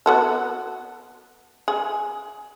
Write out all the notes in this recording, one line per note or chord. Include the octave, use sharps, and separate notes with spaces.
B3 F#4 A4
G#4